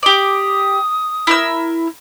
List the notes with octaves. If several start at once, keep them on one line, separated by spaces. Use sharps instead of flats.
G4 D5 D#6
E4 A#4 E6